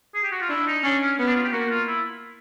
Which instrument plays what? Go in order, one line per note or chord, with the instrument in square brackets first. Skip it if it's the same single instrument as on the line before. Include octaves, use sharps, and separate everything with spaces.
[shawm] G#4
G4
F#4
F4
[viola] D4 [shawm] E4
[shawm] D#4
[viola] C#4 [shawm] D4
[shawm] C#4
[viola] B3 [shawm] C#4
[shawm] D4
F4
G4
[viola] A#3 [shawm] F#4
[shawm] F4
E4